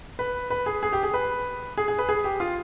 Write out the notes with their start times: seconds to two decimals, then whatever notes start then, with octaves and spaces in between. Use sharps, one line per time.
0.19 B4
0.50 B4
0.66 G#4
0.83 G#4
0.93 G4
1.03 G#4
1.14 B4
1.77 G#4
1.88 G#4
1.99 B4
2.09 G#4
2.24 G4
2.40 F4